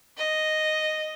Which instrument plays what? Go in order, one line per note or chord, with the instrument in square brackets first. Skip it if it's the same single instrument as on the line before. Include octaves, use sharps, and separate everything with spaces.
[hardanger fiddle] D#5